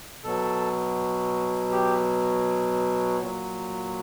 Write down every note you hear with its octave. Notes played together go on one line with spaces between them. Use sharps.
B2 F#3 A4
G4
A#2 F#3